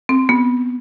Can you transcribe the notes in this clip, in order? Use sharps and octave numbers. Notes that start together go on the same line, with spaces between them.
C4
B3